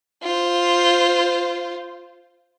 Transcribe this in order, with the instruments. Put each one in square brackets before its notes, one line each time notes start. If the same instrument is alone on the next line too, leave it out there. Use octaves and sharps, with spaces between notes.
[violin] F4 C5